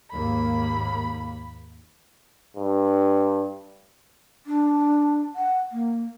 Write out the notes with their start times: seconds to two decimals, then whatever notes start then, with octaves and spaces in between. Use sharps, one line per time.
0.11 D#2 G#2 A#3 B5
2.56 G2
4.47 D4
5.36 F#5
5.72 A#3